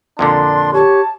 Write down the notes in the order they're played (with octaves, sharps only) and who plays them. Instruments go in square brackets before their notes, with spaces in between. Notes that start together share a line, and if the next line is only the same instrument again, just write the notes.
[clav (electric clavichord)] F2 A#2 D3 [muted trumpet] D4 [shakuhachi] C6
[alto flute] G4 [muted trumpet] C#5 [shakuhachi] A5